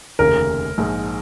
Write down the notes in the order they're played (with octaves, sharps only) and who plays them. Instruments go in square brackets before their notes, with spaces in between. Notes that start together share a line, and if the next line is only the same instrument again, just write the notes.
[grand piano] F1 D#2 C#3 A#3 [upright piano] A#4
[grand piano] A#1 G#2 G#3